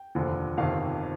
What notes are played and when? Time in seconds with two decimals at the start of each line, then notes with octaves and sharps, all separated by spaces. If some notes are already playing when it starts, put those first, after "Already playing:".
Already playing: G5
0.15 F1 D#2 D3 F3
0.58 G1 F2 C3 D#3 F5